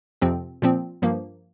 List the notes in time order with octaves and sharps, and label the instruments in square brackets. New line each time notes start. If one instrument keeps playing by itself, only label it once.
[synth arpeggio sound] F2 C3 F3 C4
A#2 F3 C4
G2 F3 A#3